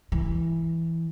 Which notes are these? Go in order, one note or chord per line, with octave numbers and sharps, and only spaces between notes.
E3